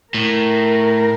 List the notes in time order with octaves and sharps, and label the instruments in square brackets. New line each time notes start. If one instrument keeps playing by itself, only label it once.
[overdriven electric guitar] A2 [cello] A#4